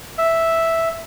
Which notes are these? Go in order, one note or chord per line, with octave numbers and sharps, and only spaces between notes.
E5